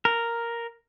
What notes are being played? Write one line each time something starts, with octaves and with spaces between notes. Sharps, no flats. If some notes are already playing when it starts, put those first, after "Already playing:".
A#4